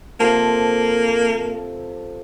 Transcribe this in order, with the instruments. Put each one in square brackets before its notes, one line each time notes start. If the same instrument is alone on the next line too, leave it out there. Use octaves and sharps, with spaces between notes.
[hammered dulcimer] C3 F3 A4 [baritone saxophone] A#3